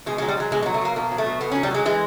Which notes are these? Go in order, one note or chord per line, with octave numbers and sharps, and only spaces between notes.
B2 G#3
F#3 G#3
G3
F#3 G#3
B2 G#3
G#3
F#3
A3
B2 A#3
B2 A#3
F#3
A3
B2
B2 B3
F#3 C#4
G3
F#3 G#3
E3 G#3